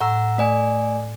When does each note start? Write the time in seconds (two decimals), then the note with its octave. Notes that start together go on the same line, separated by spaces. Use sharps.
0.01 A2 F#5 A#5 E6
0.38 A3 D5 G#5